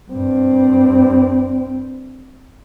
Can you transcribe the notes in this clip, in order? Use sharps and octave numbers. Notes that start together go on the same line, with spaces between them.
G2 C4